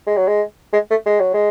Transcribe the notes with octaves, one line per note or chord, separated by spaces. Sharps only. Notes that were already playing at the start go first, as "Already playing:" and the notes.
G#3
F#3
G#3
G#3
A3
G#3
F#3
G#3